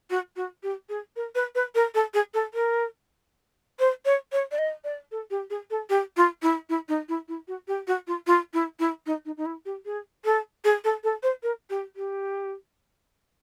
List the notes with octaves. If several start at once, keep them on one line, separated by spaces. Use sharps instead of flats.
F#4
F#4
G4
G#4
A#4
B4
B4
A#4
A4
G#4
A4
A#4
C5
C#5
C#5
D5
D#5
D5
A4
G4
G#4
A4
G4
F4
E4
E4
D#4
E4
E4
F#4
G4
F#4
F4
F4
E4
E4
D#4
D#4
D#4
E4
G4
G#4
A4
G#4
A4
A4
C5
A#4
G4
G4